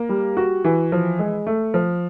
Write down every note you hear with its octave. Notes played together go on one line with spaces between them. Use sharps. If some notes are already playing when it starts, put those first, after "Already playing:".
Already playing: A#3
G3
F#4
E3
F3
G#3
A3
F3